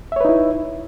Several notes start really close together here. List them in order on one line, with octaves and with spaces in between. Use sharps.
E5 C#5 B4 D#4 E4